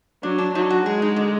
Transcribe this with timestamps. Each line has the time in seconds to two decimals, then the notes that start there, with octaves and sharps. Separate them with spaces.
0.23 F#3 D4
0.38 D4
0.55 F#3 D#4
0.70 F#4
0.86 G#3 G#4
1.02 D#4
1.16 D3